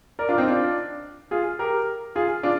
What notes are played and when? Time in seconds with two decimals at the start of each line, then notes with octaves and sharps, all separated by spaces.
0.19 A#4 D5
0.29 D4 F4
0.38 C4 D#4
0.47 D4 F4
1.31 F4 G#4
1.59 G4 A#4
2.16 F4 G#4
2.43 D4 F4